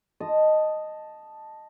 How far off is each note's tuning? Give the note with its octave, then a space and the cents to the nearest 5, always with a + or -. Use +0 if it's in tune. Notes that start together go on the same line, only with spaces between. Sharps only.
D#5 -5 A5 +0